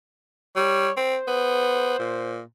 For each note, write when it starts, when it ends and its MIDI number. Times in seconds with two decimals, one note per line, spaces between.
0.56 0.89 55
0.56 0.92 73
0.97 1.16 60
0.97 2.39 72
1.28 1.96 59
1.99 2.41 46